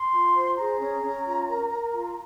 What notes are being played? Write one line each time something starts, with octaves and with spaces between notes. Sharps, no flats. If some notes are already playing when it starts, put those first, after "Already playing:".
Already playing: C6
F4
C5
G#4 A#5
C#4
C#4
F4
A#4
A#4
F4